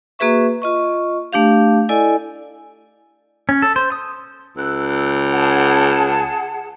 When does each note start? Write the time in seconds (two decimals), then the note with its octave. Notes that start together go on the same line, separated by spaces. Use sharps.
0.19 A#3 F#4 G#4 B4 E5 C#6
0.62 F4 D#5 C#6
1.33 A3 D4 G4 F5
1.89 E4 A4 D5 D#5 G#5
3.49 C#4
3.62 A4
3.76 C5
3.92 D#6
4.57 C#2 E6 F#6
5.32 G#4 F#5 A5